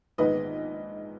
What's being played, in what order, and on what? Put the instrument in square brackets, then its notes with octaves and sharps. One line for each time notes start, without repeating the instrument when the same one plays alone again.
[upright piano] A#1 G#2 D#3 G#3 B3 B4 D#5